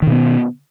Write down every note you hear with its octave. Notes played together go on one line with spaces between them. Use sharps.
B2 D#3 B3